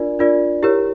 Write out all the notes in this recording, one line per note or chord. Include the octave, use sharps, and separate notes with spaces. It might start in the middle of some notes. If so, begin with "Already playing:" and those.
Already playing: D4 F4 A#4 D5
D4 F4 A#4 D5
E4 G4 A#4 C#5